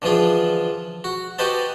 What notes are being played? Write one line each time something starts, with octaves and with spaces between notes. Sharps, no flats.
D3 E3 F3 F4 G#4
F#4
F#4 G4 B4 C5 D#5 A5